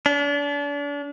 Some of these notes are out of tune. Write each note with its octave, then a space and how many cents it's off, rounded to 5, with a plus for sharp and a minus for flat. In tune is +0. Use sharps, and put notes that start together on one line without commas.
D4 -35